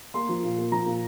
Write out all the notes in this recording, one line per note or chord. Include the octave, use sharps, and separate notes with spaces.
A#3 C6
F3
A#2
A#3
F3 A#5
A#2